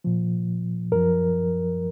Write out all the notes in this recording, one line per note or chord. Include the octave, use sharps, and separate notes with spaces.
A#2 F3
F#2 F3 A#4